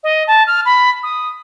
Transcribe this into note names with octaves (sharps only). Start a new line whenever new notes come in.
D#5
A5
F6
B5
D#6